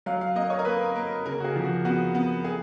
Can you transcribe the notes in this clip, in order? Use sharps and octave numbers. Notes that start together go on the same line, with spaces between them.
F#3 F5
F5
A#3 D#5
C#5
A#4
A#3 B4
A#3
C#3 A#4
F#4
G#4
F3
F#4
B3 F#4
B3
G#4